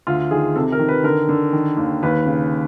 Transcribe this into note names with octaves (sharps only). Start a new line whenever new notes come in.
D2 F4
D#3 G#4
C3 A4
A#4
D#3
B4
D3 A#4
D3
D#3
D#2
D#2 B4
C#3